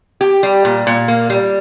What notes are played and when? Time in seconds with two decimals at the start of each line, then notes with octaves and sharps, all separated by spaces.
0.21 G4
0.43 G3
0.65 A#2
0.87 A#2
1.08 A#3
1.30 G3